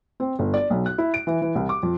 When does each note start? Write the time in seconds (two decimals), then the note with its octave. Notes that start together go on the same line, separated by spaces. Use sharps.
0.20 C4
0.39 G1
0.54 D5
0.70 B1
0.86 F#6
0.98 E4
1.14 D7
1.27 E3
1.42 E3
1.55 C2
1.69 D6
1.83 F2